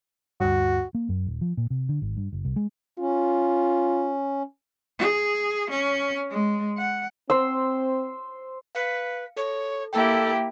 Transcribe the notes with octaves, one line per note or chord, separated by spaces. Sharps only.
D2 G2 F#4
A#3
F#2
D#1
F3
A#2
C3
D3
G#1
G2
F#1
C2
G#3
C#4 F4
G#4
C#4
G#3
F#5
C4 C5 E6
B4 F5 C#7
A4 C#5
A#3 E4 G4 A4 G5